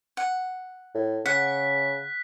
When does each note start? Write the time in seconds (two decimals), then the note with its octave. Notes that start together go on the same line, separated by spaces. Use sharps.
0.17 F#5
0.95 A2
1.26 C#3 F#5 F#6 B6